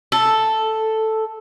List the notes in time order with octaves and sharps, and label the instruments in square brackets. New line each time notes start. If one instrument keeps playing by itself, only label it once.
[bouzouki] A4